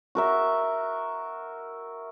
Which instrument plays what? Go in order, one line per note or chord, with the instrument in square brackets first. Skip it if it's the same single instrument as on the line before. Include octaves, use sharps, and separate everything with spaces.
[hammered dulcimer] F#4 A#4 E5